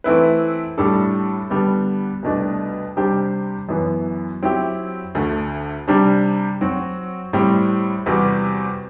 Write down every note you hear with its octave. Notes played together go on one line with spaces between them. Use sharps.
E3 A3 C4 E4 B4
A2 G3 D4 A4
D3 G3 B3 D4
C2 B2 A3 D4
C3 G3 D4 G4 C5
F#2 E3 B3
F#3 C4 E4 G4
D2 D3 A3
C3 G3 D4
F#3 C4 F#4
A2 G3 C4
E2 C3 G3 C4 F#4